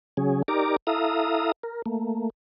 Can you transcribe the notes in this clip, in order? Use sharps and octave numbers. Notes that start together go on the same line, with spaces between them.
C#3 F#3 C#4 G#4
D#4 G4 A#4 D5 A#5 D6
E4 A4 E5 F5 A#5 D#6
A#4
A3 A#3